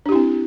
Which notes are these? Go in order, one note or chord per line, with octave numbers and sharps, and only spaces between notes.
C4 D4 E4 G4